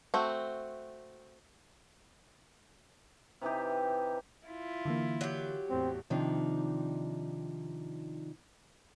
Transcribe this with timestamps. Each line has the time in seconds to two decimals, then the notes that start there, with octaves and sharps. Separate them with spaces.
0.14 A3 C4 F#4
3.42 C3 E3 D#4 G4
4.46 E4 F4
4.85 D3 E3 A#3
5.21 F#3 G4
5.70 E2 A2 C4
6.10 C3 D#3 F3 D4 D#4